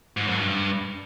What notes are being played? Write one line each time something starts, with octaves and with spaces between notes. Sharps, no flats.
G#2
F#2
G2